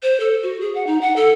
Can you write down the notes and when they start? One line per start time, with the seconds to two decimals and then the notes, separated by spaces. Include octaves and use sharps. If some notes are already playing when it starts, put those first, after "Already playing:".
0.03 C5
0.20 A4
0.43 F#4
0.61 G#4
0.75 F#5
0.87 D#4
1.01 F#5
1.16 A4